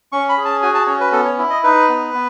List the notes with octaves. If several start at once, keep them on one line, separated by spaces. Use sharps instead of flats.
C#4 C#6
B5
G#4
A5
F#4 G#5
A5
C#4 C#5
B4
B3 A4
C#5
E4
D#5
D#4 B4
B3
B3